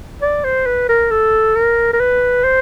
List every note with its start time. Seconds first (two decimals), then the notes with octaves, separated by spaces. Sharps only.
0.22 D5
0.44 C5
0.66 B4
0.89 A#4
1.11 A4
1.56 A#4
1.93 A#4
2.00 B4
2.44 C5